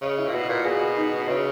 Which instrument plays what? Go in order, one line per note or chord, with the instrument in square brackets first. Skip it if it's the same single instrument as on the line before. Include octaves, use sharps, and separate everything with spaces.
[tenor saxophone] C#3 [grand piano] D#5
[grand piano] E4
[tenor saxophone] A#2
[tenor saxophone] B2 [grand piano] F#4
[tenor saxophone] A#2
[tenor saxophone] B2 [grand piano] G#4
[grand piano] F#4
D#4
[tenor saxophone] C#3 [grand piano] E4